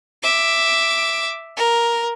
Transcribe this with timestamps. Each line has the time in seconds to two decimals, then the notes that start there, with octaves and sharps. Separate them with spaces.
0.23 E5 D6
1.57 A#4